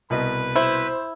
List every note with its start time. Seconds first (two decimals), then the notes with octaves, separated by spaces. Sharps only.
0.10 C2 B2 B4 D#5
0.56 E4 C5